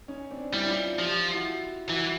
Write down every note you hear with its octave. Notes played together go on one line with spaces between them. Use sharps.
C#4 D#4
C4 D4
G3 D4 E4
D#4 F4
F3 F4 G4
E4 F#4
E3 E4 F#4